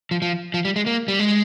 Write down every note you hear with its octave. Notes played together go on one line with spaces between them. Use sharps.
F3
F3
F3
G3
G#3
A#3
G3
G#3